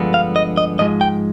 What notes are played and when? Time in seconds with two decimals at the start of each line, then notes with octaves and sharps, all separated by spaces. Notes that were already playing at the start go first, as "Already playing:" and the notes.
Already playing: G2 D3 F3 G#3 B3
0.14 F5
0.36 D#5
0.57 D#5
0.79 G#2 F3 G#3 D#5
1.01 G5